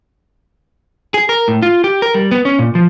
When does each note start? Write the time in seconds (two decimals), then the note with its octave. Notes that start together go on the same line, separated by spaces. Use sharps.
1.14 G#4
1.29 A#4
1.48 A2
1.62 F4
1.84 G4
2.02 A#4
2.14 G3
2.31 B3
2.45 C#4
2.59 A#2
2.75 F3